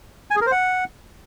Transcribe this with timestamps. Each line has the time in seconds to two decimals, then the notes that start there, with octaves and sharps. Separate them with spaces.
0.31 G#5
0.36 G#4
0.41 A#4
0.46 C5
0.52 F#5